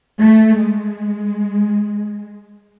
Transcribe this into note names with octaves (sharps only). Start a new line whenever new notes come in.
A3
G#3